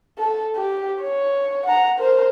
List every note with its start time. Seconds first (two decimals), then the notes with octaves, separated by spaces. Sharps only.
0.18 A4
0.56 G4
1.02 C#5
1.66 F#5 A#5
1.99 A#4 C5